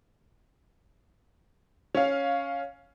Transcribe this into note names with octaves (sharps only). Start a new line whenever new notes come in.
C#4 F5